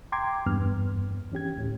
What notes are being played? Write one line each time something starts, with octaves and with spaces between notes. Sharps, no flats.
G5 A#5 C6 D6 G#6
E2 G2 B3 F6
E3 C#4 G4 G#6
D2 A2